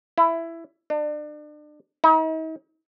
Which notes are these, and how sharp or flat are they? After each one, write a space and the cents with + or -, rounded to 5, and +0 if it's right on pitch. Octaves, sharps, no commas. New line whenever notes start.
E4 +10
D4 +35
D#4 +45